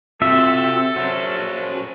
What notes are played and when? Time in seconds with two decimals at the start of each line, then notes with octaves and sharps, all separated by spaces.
0.22 C3 F4 F#4 A4 E5
0.96 C#4 F#4 A#4 C5